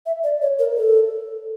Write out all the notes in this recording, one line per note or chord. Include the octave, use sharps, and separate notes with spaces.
E5
D5
C#5
A#4
A4